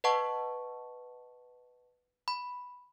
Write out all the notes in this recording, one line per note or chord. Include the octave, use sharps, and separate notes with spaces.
B4 D#5 F#5 A5 C#6
B5